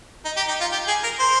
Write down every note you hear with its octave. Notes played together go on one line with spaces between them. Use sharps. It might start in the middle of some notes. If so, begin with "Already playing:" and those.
D#4
G4
D#4
F4
G4
G#4
A#4
C5